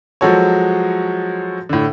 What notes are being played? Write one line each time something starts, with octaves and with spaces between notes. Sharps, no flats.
F3 F#3 G#3 F#4 A4 C#5
A2 D3